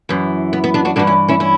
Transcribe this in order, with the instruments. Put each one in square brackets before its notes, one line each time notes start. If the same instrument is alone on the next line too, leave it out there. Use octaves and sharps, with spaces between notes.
[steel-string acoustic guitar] F#2 E3
B3
B3
B3 D4
D4 F#4
G2 D4 F#4
E3
C#4 E4
C#4 E4
C#4 E4